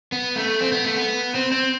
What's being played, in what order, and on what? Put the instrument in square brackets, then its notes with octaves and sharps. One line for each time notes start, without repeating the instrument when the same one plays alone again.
[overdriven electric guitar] B3
A3
C4
B3
A3
B3
C4
C4